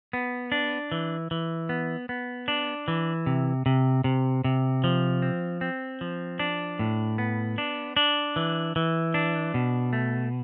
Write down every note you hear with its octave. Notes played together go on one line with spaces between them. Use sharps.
B3
D4
E3
E3
B3
B3
D4
E3
C3
C3
C3
C3
F3
C4
C4
F3
D4
A2
B3
D4
D4
E3
E3
D4
B2
A3